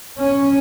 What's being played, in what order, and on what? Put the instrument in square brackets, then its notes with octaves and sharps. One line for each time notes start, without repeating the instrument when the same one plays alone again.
[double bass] C#4